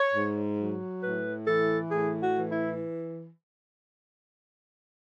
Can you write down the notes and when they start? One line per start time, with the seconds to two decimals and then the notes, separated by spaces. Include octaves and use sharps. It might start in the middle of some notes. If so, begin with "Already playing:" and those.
Already playing: C#5
0.13 G#2
0.58 F#3
1.03 A2 B4
1.46 E3 A4
1.91 A2 G#4
2.22 F#4
2.35 E3
2.51 E4